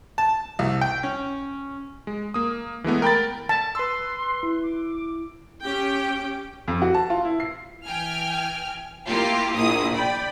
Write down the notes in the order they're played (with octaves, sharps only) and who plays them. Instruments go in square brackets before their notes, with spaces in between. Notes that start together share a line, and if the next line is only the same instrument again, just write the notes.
[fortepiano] A5
C2
G5
C#4
[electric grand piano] G#3
A#3 D#6
E3 G#3 A3 B3
A#4 G5 B5 A6
[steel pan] A5
[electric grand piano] B4 E6 [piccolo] C6
[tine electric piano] E4
[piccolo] D6
[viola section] C#4 G4 G5
[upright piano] F2
F#4
A5
F4
E4
C7
[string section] E3 G5 G#5 F6
A#3 E4 F4 G4
A#1 A#2 E4 D#6
D5 G5 B5